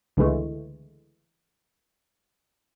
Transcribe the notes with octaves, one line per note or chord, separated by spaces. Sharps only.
C#2 D3 E3 G#3 A3